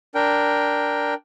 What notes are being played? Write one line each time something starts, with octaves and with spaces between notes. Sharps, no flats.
D4 A#4 G5